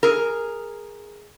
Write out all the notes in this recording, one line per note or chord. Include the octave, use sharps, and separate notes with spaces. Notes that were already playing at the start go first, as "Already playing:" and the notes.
G#4 A#4